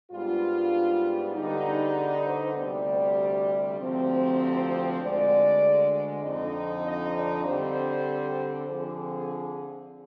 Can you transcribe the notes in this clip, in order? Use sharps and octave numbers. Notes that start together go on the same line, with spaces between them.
G#2 G3 B3 D4 F4
D3 G3 B3 D#4
G#4
D5
C5
D2 C3 G3 D5
D2 C3 F3 C4
D2 D3 G#3 D5
F2 D3 F3 C4 D#4 D#5
D#5
D5
D3 G3 C4 C5
D3 F3 C4 G#4